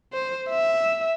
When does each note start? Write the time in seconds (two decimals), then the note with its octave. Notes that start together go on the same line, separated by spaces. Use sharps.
0.13 C5
0.50 E5